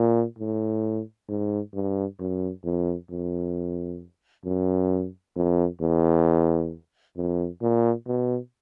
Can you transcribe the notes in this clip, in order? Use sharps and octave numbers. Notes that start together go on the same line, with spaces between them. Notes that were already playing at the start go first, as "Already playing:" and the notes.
Already playing: A#2
A2
G#2
G2
F#2
F2
F2
F#2
F2
E2
F2
A#2
B2